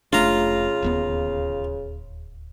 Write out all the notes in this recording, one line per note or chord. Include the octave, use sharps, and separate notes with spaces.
F1 C#3 A3 D4 F4 A#5
D1 D#2 B3